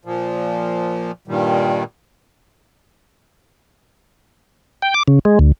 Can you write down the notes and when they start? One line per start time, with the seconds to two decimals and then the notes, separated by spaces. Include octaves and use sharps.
0.05 A#2 F3
1.28 G2 A#2 D#3 G3
4.82 G5
4.94 D6
5.08 C#3
5.25 G#3
5.39 D2